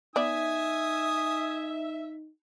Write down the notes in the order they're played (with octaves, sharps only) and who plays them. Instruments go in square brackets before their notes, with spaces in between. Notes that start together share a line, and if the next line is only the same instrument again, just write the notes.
[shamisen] B3 D5 [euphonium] D#4 [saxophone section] E5 [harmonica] G#5 D#6